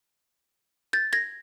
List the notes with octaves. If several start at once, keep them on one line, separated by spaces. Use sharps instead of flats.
G6 A6
G#6 A#6